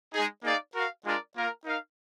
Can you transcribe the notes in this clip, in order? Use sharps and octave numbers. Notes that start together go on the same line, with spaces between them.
G#3 D#4 G#4
A#3 D#4 G#4 D5 F5
F#4 A#4 F5
G#3 D4 F4 A#4 D5
A#3 F4 A#4 F5
D#4 A#4 F5